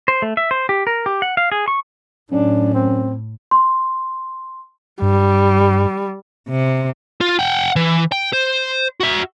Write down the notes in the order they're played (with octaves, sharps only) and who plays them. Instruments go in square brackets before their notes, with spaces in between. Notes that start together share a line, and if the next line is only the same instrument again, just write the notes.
[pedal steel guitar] C5
A3
E5
C5
G4
A#4
G4
F#5
F5
G#4
C#6
[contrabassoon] F#2 [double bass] A2 [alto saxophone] D4
[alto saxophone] C4
[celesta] C6
[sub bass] G2 [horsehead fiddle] G3
[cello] C3
[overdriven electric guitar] F4
F#5 G5
E3
G5
C5
F#4 E5